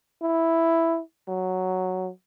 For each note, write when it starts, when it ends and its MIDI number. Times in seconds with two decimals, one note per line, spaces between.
0.22 1.00 64
1.28 2.10 54